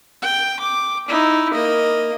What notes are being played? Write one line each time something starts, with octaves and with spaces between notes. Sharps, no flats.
G5
D6
D#4 E4
A#3 D#5